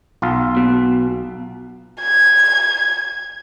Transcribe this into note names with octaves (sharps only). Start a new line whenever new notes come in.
B1 F4
B2
G#6